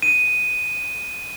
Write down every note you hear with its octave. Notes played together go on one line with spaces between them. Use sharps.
D#7